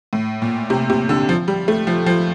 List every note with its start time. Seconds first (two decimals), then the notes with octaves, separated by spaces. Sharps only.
0.13 A2
0.42 A#2
0.70 C3
0.90 C3
1.09 D3
1.29 F3
1.48 G3
1.68 A3
1.87 F3
2.06 F3